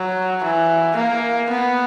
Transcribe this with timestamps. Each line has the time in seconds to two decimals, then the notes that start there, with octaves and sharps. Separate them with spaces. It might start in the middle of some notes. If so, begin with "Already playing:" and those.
Already playing: F#3
0.43 E3
0.96 A#3
1.49 B3